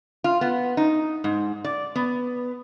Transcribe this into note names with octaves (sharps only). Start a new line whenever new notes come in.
F4
B3
D#4
G#2
D5
B3